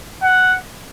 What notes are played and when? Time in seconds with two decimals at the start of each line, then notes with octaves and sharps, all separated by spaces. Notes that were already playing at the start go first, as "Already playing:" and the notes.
0.23 F#5